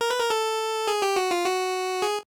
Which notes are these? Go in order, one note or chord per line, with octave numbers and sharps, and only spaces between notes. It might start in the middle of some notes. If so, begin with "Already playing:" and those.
A#4
B4
A#4
A4
G#4
G4
F#4
F4
F#4
G#4